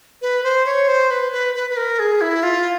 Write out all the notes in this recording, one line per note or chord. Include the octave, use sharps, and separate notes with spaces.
B4
C5
C#5
C5
B4
B4
B4
B4
A#4
G#4
E4
F4